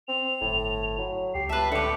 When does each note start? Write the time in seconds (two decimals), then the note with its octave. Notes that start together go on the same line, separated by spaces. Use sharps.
0.08 C4 F7
0.41 G1 A2
0.98 F#3
1.34 C#2 G4 C7
1.49 B4 E5 A5
1.72 A2 D3 G4 C#7